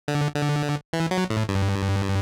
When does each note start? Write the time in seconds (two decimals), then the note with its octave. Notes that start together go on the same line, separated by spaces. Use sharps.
0.08 D3
0.36 D3
0.93 E3
1.11 F#3
1.30 A2
1.49 G2